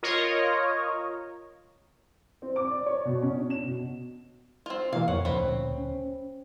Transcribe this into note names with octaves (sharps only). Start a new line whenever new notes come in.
F4 A#4 C#5 D#5
C4
D6
D5
C#5
B2
C#4
D4
E7
B2
C4 F4
B2 E3 A#3 F5
F2 F3 C#5 F#5
D2 A#2 C#3 C4 B4
C#4